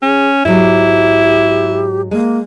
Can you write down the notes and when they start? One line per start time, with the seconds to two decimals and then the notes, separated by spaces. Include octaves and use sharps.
0.02 C#4 G#4
0.45 G#2 F#3 E4 G4
2.11 G#3 A#3